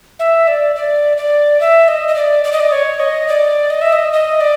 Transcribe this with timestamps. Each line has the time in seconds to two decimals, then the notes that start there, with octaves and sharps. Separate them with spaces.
0.19 E5
0.48 D5
0.76 D5
1.17 D5
1.60 E5
1.88 D#5
2.08 D#5
2.16 D5
2.44 D5
2.53 D#5
2.60 D5
2.72 C#5
3.00 D#5
3.28 D5
3.70 D#5
3.81 E5
3.92 D#5
4.13 D#5
4.40 D5